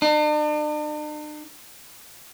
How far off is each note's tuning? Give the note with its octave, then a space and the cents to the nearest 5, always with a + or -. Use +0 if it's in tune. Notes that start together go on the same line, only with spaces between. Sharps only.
D4 +45